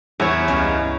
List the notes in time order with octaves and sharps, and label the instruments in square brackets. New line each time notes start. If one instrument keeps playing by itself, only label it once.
[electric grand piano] E2 [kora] E4 C#5
[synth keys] C#2 G2 [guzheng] C#4 D#5 F5